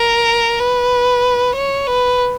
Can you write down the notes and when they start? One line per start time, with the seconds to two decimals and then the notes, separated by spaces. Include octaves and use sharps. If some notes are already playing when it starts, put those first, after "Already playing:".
Already playing: A#4
0.59 B4
1.55 C#5
1.86 B4